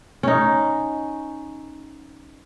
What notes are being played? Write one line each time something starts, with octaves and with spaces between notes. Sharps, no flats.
C#4 D#4